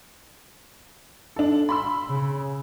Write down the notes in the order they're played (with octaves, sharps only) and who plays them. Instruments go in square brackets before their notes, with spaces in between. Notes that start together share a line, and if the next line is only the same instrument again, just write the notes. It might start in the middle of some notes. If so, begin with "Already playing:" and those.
[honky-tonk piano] D4 A4
B5 C6 E6
[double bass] C#3